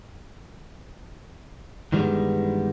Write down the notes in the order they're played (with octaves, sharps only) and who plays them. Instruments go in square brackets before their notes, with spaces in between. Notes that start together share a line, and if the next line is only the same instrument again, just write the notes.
[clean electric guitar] G2 D#3 E3 G3 G#3 B3